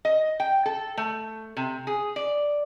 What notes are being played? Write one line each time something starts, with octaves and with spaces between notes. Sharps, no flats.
D#5
G5
A4
A3
C3
G#4
D5